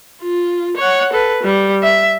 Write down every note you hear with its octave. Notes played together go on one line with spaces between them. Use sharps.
F4
C#5 F#5
A4 B4
G3
E5